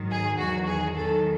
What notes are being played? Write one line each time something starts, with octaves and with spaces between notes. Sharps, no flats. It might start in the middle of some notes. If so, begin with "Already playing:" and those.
Already playing: G#2 D#3 F#3
G#4
E2 D#3 F#3 F#4
G#4
E2 D#3 F#3 A4